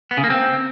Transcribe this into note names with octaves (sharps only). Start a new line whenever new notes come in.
B3
C#3
A#3
C4